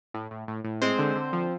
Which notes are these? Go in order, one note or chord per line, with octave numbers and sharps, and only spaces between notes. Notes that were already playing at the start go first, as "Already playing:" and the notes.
A2
A2
A2
A2
G#3 C4 C5
D3
D3
F3